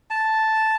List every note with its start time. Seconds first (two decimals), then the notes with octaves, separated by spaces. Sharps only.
0.11 A5